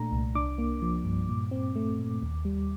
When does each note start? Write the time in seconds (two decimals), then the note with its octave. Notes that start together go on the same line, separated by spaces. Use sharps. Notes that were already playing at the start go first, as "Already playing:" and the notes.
Already playing: A#2 A3 D4 A#5
0.12 C2
0.35 D4 D6
0.58 A#3
0.82 F3
1.05 G2
1.29 A#2
1.51 C4
1.76 A3
1.99 A#2
2.23 D#2
2.45 G3